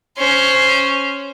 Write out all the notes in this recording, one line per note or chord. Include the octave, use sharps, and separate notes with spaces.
C#4 C5